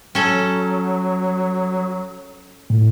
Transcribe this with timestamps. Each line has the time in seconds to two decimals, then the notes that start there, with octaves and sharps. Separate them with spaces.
0.15 F#3 C#4 A4
2.70 A2